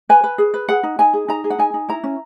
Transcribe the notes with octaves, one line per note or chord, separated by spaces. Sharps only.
B4 G#5
B4
G#4
B4
G#4 F#5
D#4
D#4 G#5
G#4
D#4 A#5
G#4
F#5
D#4 G#5
D#4
E4 A#5
C#4